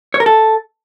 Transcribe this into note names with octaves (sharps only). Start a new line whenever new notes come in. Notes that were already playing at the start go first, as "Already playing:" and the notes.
C#5
A#4
A4